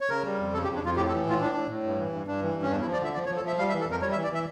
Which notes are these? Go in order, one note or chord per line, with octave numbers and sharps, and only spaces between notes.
C#5
C#3 A#4
G3
F2
C#3 A4
G4
F2
D4
F2 F4
A2 G4
A4
E3
A2 F4
A2 D4
A2
A2
G2
E3
G2
G2 D4
E3
G2
C#4
E2 D4
E4
F3
D5
D3 E5
F3 D5
C#5
F3
A4
F3 E5
G3 F5
E5
E3
A4
F2 A#4
G3 C#5
E5
E3
D5
E3 E5